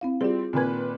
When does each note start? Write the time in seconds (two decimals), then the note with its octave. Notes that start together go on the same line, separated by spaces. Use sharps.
0.01 C4 E4 F5
0.21 G3 C4 F4 G#4
0.53 A#2 D#3 C4 B4 G#5 G#6